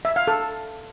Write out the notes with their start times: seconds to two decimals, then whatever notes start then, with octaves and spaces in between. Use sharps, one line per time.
0.05 E5
0.16 F5
0.27 A4